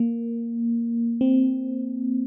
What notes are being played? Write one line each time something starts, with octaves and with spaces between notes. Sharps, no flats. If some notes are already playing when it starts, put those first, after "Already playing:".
Already playing: A#3
C4